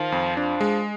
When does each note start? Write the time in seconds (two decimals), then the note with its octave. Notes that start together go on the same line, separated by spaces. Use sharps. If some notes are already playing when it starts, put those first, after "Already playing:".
Already playing: D#3 F3
0.12 F2
0.37 F3 D4
0.61 G#3